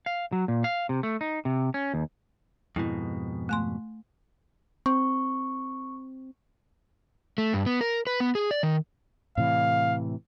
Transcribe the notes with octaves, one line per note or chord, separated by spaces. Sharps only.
F5
F#3
A#2
F5
C3
A3
D#4
C3
C#4
D#2
F2 G#2 B2 E4
A3 G#5 C6
C4 C#6
A3
G2
B3
A#4
B4
B3
G#4
D5
D#3
A2 C3 E3 F5